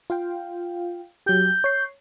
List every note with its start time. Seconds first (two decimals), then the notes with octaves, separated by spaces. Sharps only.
0.10 F4 F5 G5
1.26 F#3 G4 G6
1.64 C#5 C7